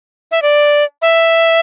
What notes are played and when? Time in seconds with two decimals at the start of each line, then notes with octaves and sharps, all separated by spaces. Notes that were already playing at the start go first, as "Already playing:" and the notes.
0.31 E5
0.42 D5
1.02 E5